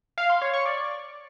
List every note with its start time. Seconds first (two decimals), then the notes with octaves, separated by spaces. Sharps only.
0.18 F5
0.30 C6
0.42 C#5
0.54 C#6
0.65 D5